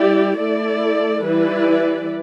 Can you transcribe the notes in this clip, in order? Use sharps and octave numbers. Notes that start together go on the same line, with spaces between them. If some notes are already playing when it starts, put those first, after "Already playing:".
Already playing: G3 E4 G4 D5
A3 E4 A4 D5
E3 G3 E4 B4 D5